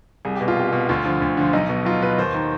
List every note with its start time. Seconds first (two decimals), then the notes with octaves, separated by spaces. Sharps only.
0.25 C2 G#4
0.35 G4
0.41 B2
0.48 F4
0.56 C2 G4
0.72 B2
0.89 D2 F4
1.05 D3 F3
1.22 D2
1.37 D3 F3
1.53 B1 D#4
1.69 B2
1.85 B1 F4
2.02 B2 B4
2.18 D#2 C5
2.34 D#3